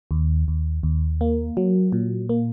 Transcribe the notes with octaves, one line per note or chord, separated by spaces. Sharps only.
D#2
D#2
D#2
A#3
F#3
A#2
A#3